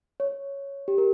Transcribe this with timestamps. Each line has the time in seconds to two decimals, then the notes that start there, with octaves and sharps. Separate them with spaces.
0.20 C#5
0.88 G4
0.98 A#4